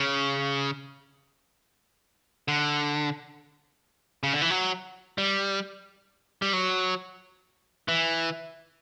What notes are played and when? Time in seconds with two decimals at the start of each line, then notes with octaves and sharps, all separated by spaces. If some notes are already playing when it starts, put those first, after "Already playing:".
Already playing: C#3
2.48 D3
4.23 C#3
4.33 D3
4.42 E3
4.50 F#3
5.18 G3
6.42 G3
6.53 F#3
7.88 E3